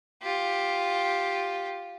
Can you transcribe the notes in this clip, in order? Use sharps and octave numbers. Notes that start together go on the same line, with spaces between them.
F4 G4